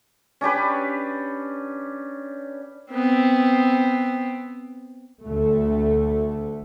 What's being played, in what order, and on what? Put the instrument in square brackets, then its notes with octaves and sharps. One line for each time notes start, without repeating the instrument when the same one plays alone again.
[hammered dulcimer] C#4 D4 G4 B4
[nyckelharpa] B3 C4
[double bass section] D2 A3